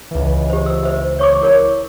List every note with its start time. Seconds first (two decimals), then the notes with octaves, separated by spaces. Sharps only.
0.11 C#2 E3
0.50 G4 C5
0.66 E6
0.83 C5 E5
1.19 C#5 C#6 D6
1.41 E4 A#4 C#5